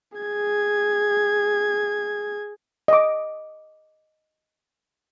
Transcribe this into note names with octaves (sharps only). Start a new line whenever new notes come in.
G#4 G#6
D#5 D6